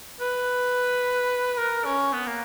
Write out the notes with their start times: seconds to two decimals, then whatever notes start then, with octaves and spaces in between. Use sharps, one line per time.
0.21 B4
1.58 A#4
1.85 C#4
2.13 B3
2.27 A#3